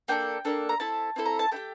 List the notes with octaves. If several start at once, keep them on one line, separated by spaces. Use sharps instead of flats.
A#3 D4 A4 G5
A#3 D4 A4
A#5
C4 E4 A4 A5
C4 E4 A4
A#5
A5
A3 E4 G4 G5